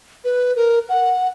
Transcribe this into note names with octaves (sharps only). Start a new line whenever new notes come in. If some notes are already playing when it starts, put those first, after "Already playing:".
B4
A#4
F#5